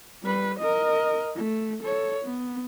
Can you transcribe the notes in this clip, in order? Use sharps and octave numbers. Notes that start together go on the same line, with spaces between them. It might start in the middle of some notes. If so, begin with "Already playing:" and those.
G3 B4
A#4 D#5
A3
A4 C#5
B3